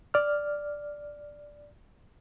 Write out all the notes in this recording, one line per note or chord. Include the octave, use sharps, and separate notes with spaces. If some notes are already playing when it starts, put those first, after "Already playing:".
D5 F6